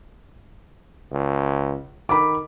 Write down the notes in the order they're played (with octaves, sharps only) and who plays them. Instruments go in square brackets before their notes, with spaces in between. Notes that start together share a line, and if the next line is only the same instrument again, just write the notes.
[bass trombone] C#2
[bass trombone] D#3 [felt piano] B5 D6